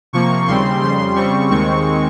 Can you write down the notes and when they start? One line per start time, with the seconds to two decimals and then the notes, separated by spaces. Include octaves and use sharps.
0.13 C3 F3 A#3 C#6
0.47 D#2 C#3 G3 C4 C6
0.81 F2 C#3 G3 C6
1.15 C#3 G3 C4 C#6
1.50 D#2 D#3 G#3 C4 C#6